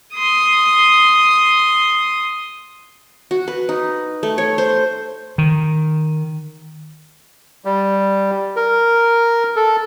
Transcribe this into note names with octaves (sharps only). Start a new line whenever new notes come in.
C6 D#6
F#4
B4
D#4
A3
C#5
C5
D#3
G3
A#4
A4